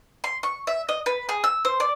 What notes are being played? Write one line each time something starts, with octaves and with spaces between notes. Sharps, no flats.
C6
C#6
E5
D#5
B4
G#4
E6
C5
D5